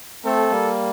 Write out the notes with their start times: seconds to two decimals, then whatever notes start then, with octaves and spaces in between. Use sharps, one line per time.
0.25 A3 C4 A4
0.51 G3 A#3